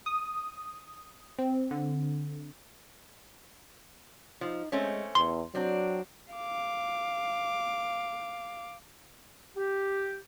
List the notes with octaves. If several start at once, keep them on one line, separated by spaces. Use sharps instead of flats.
D#6
C4
D3
F3 D#4
G#3 A3 C4 C#4
E2 C6
F#3 C4 D4
F5 D6
G4